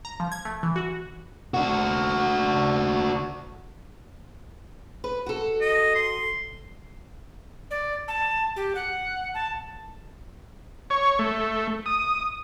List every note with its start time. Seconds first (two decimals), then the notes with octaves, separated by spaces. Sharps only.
0.05 A#5
0.20 F3
0.32 G#6
0.45 A3
0.63 E3
0.76 F#4
1.54 D4 F#4
5.04 B4
5.26 F#4 A4
5.61 D#5
5.95 C6
7.71 D5
8.08 A5
8.56 G4
8.75 F#5
9.34 A5
10.90 C#5
11.19 A3
11.86 D#6